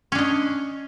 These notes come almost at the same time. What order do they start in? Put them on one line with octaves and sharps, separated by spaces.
C#4 D4 D#5